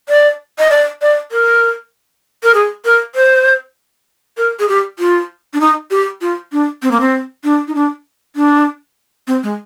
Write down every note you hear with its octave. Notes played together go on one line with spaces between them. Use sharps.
D5
D#5
D5
D5
A#4
A#4
G#4
A#4
C5
A#4
G#4
G4
F4
D4
D#4
G4
F4
D4
C4
A#3
C4
D4
D#4
D4
D4
C4
G#3